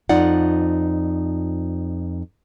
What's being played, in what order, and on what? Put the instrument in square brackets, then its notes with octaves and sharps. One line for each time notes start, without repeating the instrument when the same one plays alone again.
[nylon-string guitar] F2 D#4 F4 D5 F#5